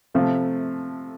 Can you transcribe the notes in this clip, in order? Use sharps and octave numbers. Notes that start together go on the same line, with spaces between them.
C3 F3 A3